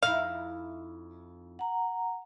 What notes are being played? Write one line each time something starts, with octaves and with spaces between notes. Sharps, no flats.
F2 D#4 E4 F5
F#5 A#5